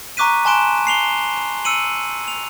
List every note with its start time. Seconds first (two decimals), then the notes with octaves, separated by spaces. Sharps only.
0.17 A#5 C#6 D6 F#6 B6 D#7
0.45 G#5 A5 C6 F#6 D7 E7
0.86 A5 C7 F7 G7
1.65 E6 C#7 D#7 F#7
2.28 F7